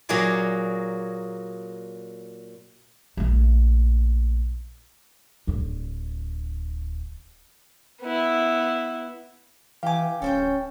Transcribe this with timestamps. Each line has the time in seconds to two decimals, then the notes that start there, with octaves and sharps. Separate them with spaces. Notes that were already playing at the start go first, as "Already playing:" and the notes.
0.09 A#2 F#3 A#3 F#4 G#4 D5
3.17 A#1 A3
5.47 D1 D3
8.02 B3 E4
9.83 E3 G4 F5 G#5 D6
10.22 D1 C#4 A4 C5 G5